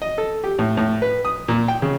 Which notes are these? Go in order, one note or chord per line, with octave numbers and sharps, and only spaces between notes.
D#5
A4
G4
A2
A2
B4
D#6
A#2
G5
C#3